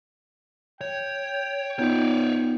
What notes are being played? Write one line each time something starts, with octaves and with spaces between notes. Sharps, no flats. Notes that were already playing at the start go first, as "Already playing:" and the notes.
C#5 G5
B3 D#4 F4 C#5 D5